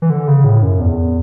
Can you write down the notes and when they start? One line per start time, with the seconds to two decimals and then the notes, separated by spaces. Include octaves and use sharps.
0.02 E3
0.10 D3
0.28 C#3
0.44 A2
0.63 F#2
0.80 E2